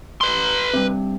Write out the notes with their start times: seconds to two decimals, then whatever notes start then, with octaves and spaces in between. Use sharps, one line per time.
0.21 B4 C6
0.74 G2 C3